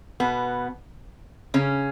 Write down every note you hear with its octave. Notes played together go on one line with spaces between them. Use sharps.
B2 B3
C#3 C#4